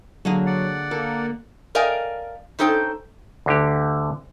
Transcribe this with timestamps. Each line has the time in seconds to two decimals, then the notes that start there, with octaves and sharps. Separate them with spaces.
0.25 D3 F#3 A#3 G#4
0.46 D5 F#5
0.91 A#3 A4
1.75 A#4 D5 D#5 F5 G5 G#5
2.59 C#4 D#4 A4 C5 G5
3.46 D2 D3 G4